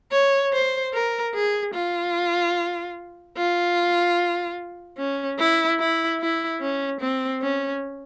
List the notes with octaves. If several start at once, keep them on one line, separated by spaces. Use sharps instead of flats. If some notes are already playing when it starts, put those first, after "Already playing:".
C#5
C5
A#4
G#4
F4
F4
C#4
E4
E4
E4
C#4
C4
C#4